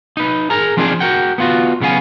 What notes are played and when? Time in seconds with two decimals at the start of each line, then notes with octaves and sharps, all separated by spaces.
0.17 D#4 B4
0.50 G#4 A#4 A#5
0.77 F3 C4 D4 D#4 G#4 C5
1.00 F#4 A#4 F#5 G5
1.38 B3 F4 F#4
1.80 B1 C#3 B3 F5 G#5